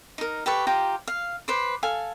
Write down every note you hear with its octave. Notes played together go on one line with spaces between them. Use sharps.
D#4 A#4
G4 A4 B4 C#6
F4 G4 G5 A#5
F5
B4 C5 D6
A4 F5 G#5